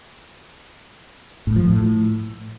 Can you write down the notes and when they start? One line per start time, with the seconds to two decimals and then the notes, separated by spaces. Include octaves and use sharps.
1.47 A2
1.56 F3
1.65 A2